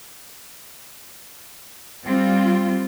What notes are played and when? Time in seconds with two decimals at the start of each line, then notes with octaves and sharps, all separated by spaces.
2.05 G3 C4 F4